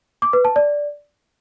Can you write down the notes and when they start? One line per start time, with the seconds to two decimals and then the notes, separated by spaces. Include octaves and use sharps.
0.22 D6
0.33 B4
0.45 A5
0.56 D5